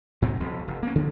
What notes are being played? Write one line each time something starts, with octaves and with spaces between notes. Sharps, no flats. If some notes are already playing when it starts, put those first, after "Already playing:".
G#2 C3 F#3 C4
B1 F2
F1
A#3 C#4
C#3 F3 G3 D4